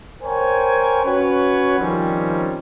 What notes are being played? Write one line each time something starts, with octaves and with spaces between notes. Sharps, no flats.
A#4 C5 C#5 G5 G#5
C#4 F#4 B4 C#5
D#3 F3 G3 C4 C#4